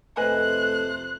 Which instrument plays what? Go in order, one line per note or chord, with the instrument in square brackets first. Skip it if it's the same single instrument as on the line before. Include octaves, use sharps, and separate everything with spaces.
[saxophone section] F2 C3 C5 [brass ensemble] A3 [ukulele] B4 D#5 G#5 [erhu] F#6